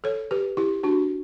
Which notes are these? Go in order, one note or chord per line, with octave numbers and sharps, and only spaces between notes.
A4 C#5
G4 B4
E4 G4
D4 F#4